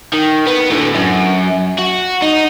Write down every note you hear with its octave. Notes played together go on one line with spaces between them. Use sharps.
D#3
B3
A2 D3
F#2
F#4
D#4